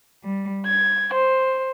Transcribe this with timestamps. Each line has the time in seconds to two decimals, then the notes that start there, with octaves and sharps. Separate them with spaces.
0.23 G3
0.66 G#6
1.13 C5